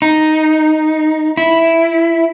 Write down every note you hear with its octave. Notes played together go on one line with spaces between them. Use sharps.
D#4
E4